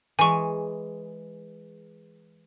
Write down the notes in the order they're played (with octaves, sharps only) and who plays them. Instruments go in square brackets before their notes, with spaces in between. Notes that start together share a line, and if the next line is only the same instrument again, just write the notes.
[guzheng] E3 G#3 [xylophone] G#5 C#6